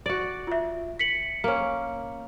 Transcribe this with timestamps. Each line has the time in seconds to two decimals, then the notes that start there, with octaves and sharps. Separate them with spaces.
0.06 F#4 D5
0.47 F4 E5
0.99 B6 C#7 F#7
1.44 A#3 C#4